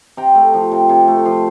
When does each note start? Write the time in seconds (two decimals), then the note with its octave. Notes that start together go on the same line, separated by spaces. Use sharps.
0.17 C3 G5 A#5
0.35 A3
0.54 F3
0.72 C3
0.89 C3
1.08 A3
1.25 F3 A5 C6